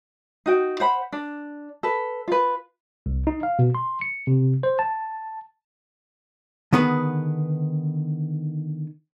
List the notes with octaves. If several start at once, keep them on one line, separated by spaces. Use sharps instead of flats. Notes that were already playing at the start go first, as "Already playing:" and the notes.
D#4 F#4 G5
C5 F#5 B5
D4
A4 B4
F4 B4
C2
D#4
F5
B2
C6
C#7
C3
C5
A5
D3 D#3 B3 G#4 B4